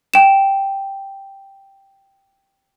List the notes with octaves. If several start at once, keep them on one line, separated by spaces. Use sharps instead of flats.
G5 E7